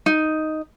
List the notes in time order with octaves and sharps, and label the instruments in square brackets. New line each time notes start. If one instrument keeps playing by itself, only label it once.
[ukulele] D#4